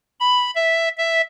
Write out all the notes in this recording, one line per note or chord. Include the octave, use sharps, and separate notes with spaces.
B5
E5
E5